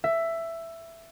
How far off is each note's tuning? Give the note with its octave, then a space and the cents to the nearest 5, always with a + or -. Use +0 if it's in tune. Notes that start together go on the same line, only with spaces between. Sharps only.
E5 +10